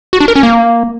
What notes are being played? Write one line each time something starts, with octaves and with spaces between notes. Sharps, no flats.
F#4
D4
A#4
C#4
A#3